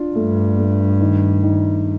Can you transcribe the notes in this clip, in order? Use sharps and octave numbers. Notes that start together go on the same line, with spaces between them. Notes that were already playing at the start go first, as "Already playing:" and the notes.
Already playing: D4 F4
G2 A3
A3
D#3
D#3